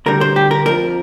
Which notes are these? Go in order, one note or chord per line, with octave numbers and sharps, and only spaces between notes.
D2 D3 G3 A#4
C5
G4
A#4
F2 F3 A#4